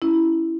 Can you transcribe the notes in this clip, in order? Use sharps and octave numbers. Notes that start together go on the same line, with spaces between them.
C#4 E4